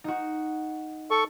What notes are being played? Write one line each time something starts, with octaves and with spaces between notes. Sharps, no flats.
D#4 F#4
A4 C#6